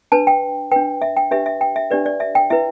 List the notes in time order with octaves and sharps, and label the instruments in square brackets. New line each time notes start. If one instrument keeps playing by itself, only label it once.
[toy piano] D4 B4 A5
G5
D4 B4 G5
E5
G5
D4 G4 B4 E5
E5
G5
E5
D4 G4 B4 D5
D5
E5
G5
E4 B4 E5